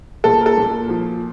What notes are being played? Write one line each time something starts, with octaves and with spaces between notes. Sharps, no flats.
A#2 A4
A#4
A4
A#2
F3